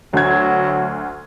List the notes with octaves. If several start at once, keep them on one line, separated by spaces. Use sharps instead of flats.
D2 F#3 G#6